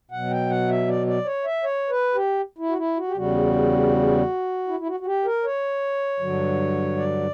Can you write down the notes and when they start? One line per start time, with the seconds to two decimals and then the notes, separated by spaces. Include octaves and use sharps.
0.11 B2 F#3 F#5
0.31 G5
0.50 F#5
0.69 E5
0.88 D5
1.07 D5
1.25 C#5
1.45 E5
1.64 C#5
1.90 B4
2.15 G4
2.58 E4
2.69 F#4
2.78 E4
2.97 F#4
3.08 G4
3.16 E2 C#3 G3 F#4
4.68 E4
4.79 E4
4.87 F#4
5.00 F#4
5.06 G4
5.25 A#4
5.44 C#5
6.20 G2 D3 F#3
6.97 D5